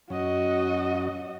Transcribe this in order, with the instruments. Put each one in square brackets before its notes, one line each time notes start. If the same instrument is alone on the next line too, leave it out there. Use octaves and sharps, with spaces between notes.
[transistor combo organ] F#2 C#4 [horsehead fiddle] F#4 D#5